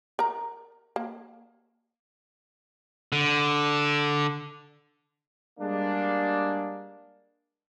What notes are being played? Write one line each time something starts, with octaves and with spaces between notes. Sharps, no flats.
A#4 A#5
A#3
D3
G3 G#3 A#3 D4